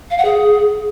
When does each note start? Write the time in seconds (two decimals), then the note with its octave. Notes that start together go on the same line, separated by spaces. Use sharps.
0.11 F5
0.18 F#5
0.25 G#4